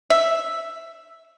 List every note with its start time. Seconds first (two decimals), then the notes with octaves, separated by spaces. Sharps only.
0.10 E5